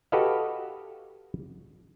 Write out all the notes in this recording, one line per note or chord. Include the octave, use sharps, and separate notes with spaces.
F#4 G4 A4 B4 D#5 F5